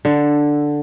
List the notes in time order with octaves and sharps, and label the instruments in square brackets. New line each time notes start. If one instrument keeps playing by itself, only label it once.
[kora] D3 A4